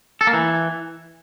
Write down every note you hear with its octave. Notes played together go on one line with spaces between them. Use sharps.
A4
A#3
E3